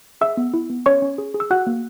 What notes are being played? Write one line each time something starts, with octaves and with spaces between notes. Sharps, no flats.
G#4 E5 E6
B3
E4
B3
C#4 C#5 C#6
C#4
G#4
G#4
E6
F#4 F#5 F#6
A#3